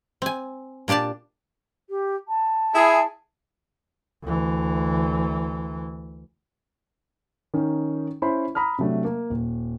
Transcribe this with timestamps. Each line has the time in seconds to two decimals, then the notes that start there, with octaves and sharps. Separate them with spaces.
0.22 C4 G#5
0.88 A#2 D4 G4 D5 A5
1.90 G4
2.28 A5
2.75 E4 G#4
4.23 D2 E3
7.54 D#3 C#4 D#4
8.22 C#4 E4 C5 B5 C6
8.55 A#5 B5 D#6 F6
8.78 C3 F#3 A3 D4
9.04 A#3
9.30 D#1